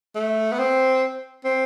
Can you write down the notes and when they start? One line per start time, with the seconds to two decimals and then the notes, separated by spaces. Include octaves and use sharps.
0.15 A3
0.52 B3
0.59 C4
1.45 C4